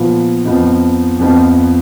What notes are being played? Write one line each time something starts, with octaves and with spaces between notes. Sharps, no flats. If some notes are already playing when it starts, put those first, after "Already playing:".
Already playing: A#2 F3 B3
F2 F3 B3 D#4
F2 F3 B3 D#4